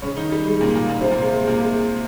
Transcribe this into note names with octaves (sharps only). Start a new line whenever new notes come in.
C#3 C#4
D#3 D#4
G3
G#3
A#2 A#3
A#2 A#3
A#2 A#3
C3 C4
A#2 A#3
G#3
G#3
A#2 A#3
G#3